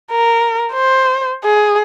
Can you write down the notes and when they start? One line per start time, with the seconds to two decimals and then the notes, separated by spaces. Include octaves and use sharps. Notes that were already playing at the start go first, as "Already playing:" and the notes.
0.12 A#4
0.73 C5
1.44 G#4